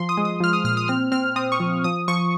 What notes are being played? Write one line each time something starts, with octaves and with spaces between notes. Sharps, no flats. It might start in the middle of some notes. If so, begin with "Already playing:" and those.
Already playing: F3 C6
D#6
G#3
D#6
F3 F6
D#6
A#2 F6
D#6
C4 F6
C4 F6
C4 D#6
C#6
F3
F3 D#6
F3 C#6